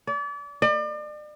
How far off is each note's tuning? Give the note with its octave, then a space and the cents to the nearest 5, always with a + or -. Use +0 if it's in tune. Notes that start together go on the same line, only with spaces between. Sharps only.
D5 -35
D5 +40